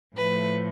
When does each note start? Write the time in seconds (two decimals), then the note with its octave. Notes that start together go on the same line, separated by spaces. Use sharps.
0.16 A2 F3 A3 B4